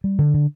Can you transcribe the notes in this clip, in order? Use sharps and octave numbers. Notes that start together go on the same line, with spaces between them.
G3
D3
D3